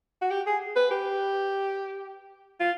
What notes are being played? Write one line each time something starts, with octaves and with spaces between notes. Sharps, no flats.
F#4
G4
G#4
B4
G4
F4